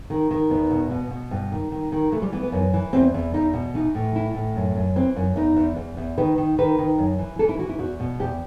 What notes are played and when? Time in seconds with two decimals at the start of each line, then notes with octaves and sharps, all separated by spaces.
0.10 D#3
0.31 D#3
0.50 E2 B3
0.71 B2
0.91 B2
1.11 B2
1.31 G2
1.51 D#3
1.72 D#3
1.92 D#3
2.12 E3 A3
2.22 G3
2.32 E3 B3
2.43 B3
2.52 F#2
2.73 E3
2.93 E2 C4
3.14 E2
3.34 E2 D#4
3.54 B2
3.74 E3 D#4
3.95 A2
4.15 E3 E4
4.35 A2
4.56 F#2
4.75 F#2
4.96 E3 C4
5.16 F#2
5.36 E2 D#4
5.56 E2
5.76 E2
5.97 E2
6.18 D#3 B4
6.38 D#3
6.58 D#3 B4
6.79 D#3
6.98 F#2
7.19 E3
7.39 E3 A4
7.49 E4
7.59 E3 F#4
7.69 E4
7.79 E2 F#4
8.00 B2
8.19 E2 G4